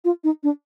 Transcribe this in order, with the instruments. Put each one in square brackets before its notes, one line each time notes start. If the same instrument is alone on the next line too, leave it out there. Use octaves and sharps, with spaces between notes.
[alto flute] F4
D#4
D4